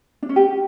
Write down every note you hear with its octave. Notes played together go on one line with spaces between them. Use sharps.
D4
C#4
G4